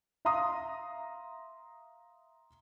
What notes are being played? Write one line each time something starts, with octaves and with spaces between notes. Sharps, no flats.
E5 F5 A#5 C6 D#6